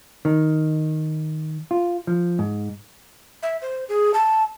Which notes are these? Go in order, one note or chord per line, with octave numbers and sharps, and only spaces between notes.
D#3
F4
F3
G#2
E5
C5
G#4
A5